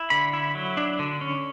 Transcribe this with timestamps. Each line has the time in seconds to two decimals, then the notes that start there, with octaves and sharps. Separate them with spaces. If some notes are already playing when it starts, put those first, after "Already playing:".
Already playing: E4
0.10 D3 B5
0.33 E4
0.55 F#3
0.77 D4
0.99 D3
1.21 C#4